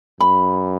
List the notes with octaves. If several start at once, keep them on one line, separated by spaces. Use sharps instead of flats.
F#2 B5